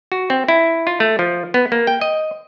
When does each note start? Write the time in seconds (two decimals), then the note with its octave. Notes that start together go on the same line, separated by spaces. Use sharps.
0.12 F#4
0.30 C4
0.48 E4
0.87 F4
1.00 A3
1.19 F3
1.54 B3
1.72 A#3
1.87 G5
2.01 D#5